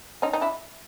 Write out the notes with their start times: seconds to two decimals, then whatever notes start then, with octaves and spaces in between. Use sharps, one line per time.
0.22 C#4 D#4
0.33 D#4
0.41 D4 E4